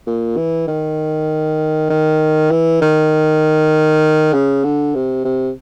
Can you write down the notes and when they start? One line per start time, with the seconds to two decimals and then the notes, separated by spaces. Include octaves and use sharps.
0.07 A#2
0.37 E3
0.68 D#3
1.90 D#3
2.51 E3
2.82 D#3
4.33 C#3
4.64 D3
4.95 C3
5.24 C3